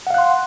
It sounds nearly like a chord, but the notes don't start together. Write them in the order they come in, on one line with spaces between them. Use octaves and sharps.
F#5 F5 F#6 C6